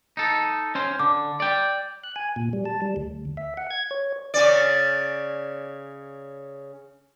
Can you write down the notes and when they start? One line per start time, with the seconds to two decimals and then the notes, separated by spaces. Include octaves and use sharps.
0.17 D#4 A4
0.75 C#4 C5
0.99 D3 D6
1.40 D5 G5
2.04 F#6
2.16 G#5
2.36 A#2
2.53 G3
2.65 A5
2.82 G3
2.96 D2
3.37 E5
3.57 F#5
3.71 G#6
3.91 C#5
4.34 C#3 C#4 D5